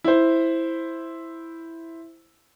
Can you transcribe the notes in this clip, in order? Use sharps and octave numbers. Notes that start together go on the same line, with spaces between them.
E4 C5